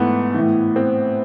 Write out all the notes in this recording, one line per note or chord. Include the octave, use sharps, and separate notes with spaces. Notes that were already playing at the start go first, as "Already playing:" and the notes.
Already playing: G#2 E3 A3 B3
A2 E3
C4